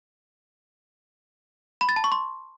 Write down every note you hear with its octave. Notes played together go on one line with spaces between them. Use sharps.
B5
A6
A5
C#6
C6